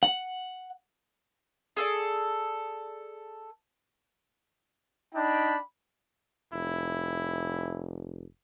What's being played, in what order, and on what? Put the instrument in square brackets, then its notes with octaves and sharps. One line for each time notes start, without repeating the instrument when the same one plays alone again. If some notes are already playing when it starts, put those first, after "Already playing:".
[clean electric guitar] F#5
[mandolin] G#4 A4 D5
[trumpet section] D4 D#4 G5 B5
[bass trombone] F1 [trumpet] E4